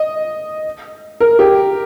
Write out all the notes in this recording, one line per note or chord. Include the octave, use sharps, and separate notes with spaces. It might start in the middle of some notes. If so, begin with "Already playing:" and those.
Already playing: D#5
A#4
G4